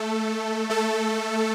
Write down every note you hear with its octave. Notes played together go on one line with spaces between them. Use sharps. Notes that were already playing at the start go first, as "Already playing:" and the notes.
Already playing: A3 A4
A3 A4